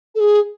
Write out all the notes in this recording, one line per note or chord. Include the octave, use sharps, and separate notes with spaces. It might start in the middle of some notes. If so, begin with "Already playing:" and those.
A4
G#4